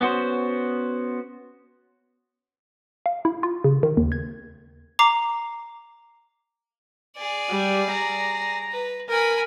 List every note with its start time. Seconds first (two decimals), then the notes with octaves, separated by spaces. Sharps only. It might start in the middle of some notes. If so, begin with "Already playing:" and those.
0.01 B3 C#4 F#4 C5
3.06 F5
3.25 E4
3.43 F4
3.64 C#3
3.83 D#3
3.97 D#2
4.12 G#6
4.99 A#5 D6 C7
7.16 G#4 D5
7.50 G3
7.91 A#5
8.72 B4
9.10 A#4 G#5 B5